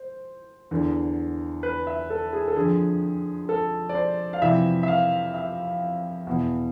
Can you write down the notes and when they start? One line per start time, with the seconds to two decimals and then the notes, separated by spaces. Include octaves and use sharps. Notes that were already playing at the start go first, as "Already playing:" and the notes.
Already playing: C5
0.71 E2 D3
1.63 B4
1.87 E5
2.10 A4
2.33 G#4
2.48 A4
2.56 F2 D3 G#4
3.49 A4
3.89 D5
3.95 C5
4.33 F5
4.41 F2 C3 E3 E5
4.83 E5
4.88 F5
5.34 E5
6.27 E2 B2